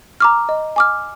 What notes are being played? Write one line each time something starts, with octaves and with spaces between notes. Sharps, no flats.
A#5 D6 F6
D#5
G#5 D6 F6